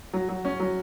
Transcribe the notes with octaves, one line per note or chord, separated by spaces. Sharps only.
F#3
F#3
C#4
F#3